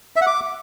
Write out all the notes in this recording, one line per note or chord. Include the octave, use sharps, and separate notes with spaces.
E5
F#5
D6